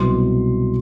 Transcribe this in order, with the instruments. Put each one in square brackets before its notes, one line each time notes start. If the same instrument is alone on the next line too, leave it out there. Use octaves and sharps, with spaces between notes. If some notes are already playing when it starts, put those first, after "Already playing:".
Already playing: [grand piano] C2 B2 F#3 B3 C6